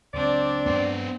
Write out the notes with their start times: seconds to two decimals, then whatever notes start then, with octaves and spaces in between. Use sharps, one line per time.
0.13 C#2 F#3 C4 D4 D5
0.66 G2 F#3 G#3 B3 C5